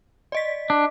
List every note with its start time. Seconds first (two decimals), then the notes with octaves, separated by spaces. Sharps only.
0.32 D5 D#5 B6
0.70 D4